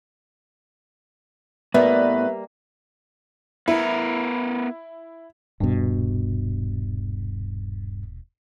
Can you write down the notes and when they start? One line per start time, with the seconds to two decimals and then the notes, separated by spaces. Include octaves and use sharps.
1.74 A2 G3 A#3 B3 B4 D5 E5
3.68 B3 E4 A#4
5.60 D#1 G2 B2